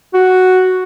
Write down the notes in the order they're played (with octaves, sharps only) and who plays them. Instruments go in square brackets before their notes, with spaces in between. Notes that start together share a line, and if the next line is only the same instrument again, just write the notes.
[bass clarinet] F#4